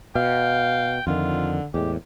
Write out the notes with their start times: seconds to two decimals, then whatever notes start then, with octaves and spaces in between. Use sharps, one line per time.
0.15 B2 F5 G5
1.07 F2 D3 D#3 F4
1.74 E2 A2 G#3 G4